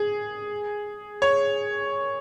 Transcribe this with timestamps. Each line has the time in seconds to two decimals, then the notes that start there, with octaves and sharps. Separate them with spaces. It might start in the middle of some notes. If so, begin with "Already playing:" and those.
Already playing: G#4
1.22 C#5